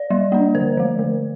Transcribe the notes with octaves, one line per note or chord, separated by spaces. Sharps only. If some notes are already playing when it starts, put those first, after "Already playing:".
Already playing: D5
G3
A#3 D4
D3 C5
F3 A3
D3